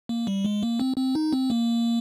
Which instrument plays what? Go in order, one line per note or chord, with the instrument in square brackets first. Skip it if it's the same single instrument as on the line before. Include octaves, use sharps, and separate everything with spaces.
[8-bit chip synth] A#3
G3
G#3
A#3
C4
C4
D#4
C4
A#3